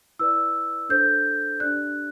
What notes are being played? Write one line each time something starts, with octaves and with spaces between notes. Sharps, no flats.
E4 B4 D5 E6
D4 A4 C5 G6
D4 G4 D5 F#6